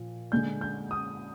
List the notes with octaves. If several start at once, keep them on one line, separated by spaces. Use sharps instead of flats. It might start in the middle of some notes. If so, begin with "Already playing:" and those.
Already playing: A#2 F3
D3 G#3 D4 G6
G6
D#6